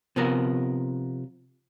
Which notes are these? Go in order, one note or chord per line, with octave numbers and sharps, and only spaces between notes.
C3 F3 B3 A#4